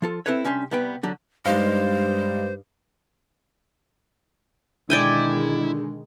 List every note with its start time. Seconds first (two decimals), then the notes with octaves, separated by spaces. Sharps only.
0.02 F3 F4 A4
0.26 C4 D4 E4 A4 B4 C#5
0.45 C2 C#4 D4 G4 C6
0.71 C2 G3 B3 B4 G5
1.03 D3 F#3 D4
1.46 G2 G3 G#3 D#4 C5 F5
4.90 B2 D3 D#3 G#3 E4 D5 G5 G#5